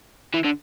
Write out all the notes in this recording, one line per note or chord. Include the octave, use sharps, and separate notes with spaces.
E3
D3